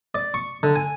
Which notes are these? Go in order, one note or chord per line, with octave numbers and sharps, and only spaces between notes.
D5
C#6
D3
G#5